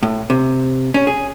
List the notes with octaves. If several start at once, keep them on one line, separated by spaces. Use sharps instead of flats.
A2
C3
C#4
G#4